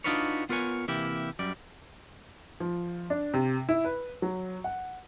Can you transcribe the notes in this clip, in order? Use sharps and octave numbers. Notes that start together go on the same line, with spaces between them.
D4 D#4 F4 F#4 B4 C#5
B3 F4 A#4 B4 C#5 G#5
C3 E3 A#3 E4 G4
F#2 G3 D5
F3
D4
C3
E4
B4
F#3
F#5